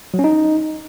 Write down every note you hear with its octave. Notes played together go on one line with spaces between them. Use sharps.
F#3
C#4
D#4